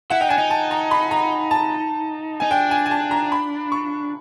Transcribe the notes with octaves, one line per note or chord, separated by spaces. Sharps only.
E4 F#5
D#4 G5
D4 G#5
D#4
A5
A#5
B5
A#5
A5
D#4 G#5
D4 G5
G#5
G#5
A5
A#5
B5
C#6